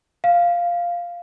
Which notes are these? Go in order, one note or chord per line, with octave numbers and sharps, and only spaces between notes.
F5